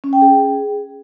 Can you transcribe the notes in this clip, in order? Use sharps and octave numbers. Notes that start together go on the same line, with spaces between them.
C#4
G5
G#4